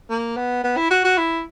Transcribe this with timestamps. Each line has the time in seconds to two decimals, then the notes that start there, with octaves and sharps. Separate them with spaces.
0.10 A#3
0.36 B3
0.64 B3
0.77 E4
0.91 F#4
1.04 F#4
1.17 E4